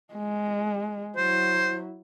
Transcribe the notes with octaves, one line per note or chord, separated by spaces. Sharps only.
G#3
F#3 E4 C5